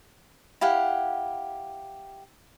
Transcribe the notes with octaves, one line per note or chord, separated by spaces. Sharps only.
E4 G4 F5 F#5